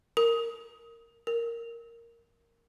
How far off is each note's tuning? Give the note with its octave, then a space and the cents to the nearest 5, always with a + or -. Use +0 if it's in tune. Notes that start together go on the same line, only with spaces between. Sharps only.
A#4 -15
A#4 -5